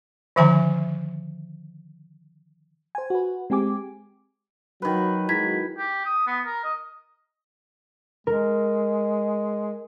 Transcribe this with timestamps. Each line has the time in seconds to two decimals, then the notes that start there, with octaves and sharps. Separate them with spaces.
0.36 D3 D#3 F3 E5 G#5 A#5
2.95 C5 G#5
3.10 F#4 B4
3.50 G#3 C4 G4 G#5 D6
4.82 D#3 F#3 B4
5.29 F#3 G#3 E4 G#6 B6
5.78 G4
6.05 D#6
6.27 B3
6.46 A#4
6.64 D#5
8.27 G#3 A#4